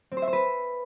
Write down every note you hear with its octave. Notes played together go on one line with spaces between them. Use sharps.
C4
C5
E5
C5
B4